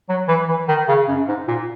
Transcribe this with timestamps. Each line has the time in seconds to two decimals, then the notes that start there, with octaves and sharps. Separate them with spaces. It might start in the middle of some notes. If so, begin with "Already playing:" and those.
0.09 F#3
0.28 E3
0.48 E3
0.68 D#3
0.88 C#3
1.08 F#2
1.28 G#2
1.48 A#2